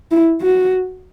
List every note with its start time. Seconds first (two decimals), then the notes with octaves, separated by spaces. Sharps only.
0.11 E4
0.42 F#4